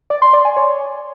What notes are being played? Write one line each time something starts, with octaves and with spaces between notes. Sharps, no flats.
D5
C6
D5
G#5
C#5